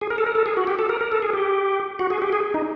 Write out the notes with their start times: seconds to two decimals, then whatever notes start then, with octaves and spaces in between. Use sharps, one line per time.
0.01 G#4
0.10 A#4
0.18 A4
0.26 A#4
0.35 A4
0.46 G#4
0.57 F#4
0.67 G4
0.79 A4
0.89 A#4
1.01 A#4
1.12 A4
1.22 G#4
1.33 G4
1.99 F#4
2.10 G#4
2.22 G4
2.32 G#4
2.54 D#4